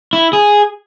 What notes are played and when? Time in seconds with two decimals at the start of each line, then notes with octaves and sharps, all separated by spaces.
0.13 E4
0.33 G#4